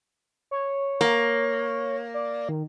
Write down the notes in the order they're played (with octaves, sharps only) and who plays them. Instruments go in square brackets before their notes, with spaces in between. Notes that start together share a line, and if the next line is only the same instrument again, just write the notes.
[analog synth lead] C#5
[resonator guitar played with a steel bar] A#3
[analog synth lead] D5
D#3